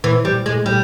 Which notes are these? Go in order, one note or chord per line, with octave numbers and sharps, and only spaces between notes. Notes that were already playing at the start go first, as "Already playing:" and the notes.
E3
G3
G#3
G3